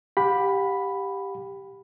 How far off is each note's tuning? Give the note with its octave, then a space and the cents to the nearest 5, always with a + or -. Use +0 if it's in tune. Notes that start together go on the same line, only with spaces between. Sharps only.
G4 +0 F#5 -45 B5 +0